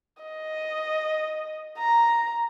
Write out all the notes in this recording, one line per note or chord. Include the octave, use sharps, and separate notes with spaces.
D#5
A#5